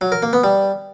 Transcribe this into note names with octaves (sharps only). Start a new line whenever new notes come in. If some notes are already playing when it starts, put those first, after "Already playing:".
F#3
A#4
A#3
B3
G3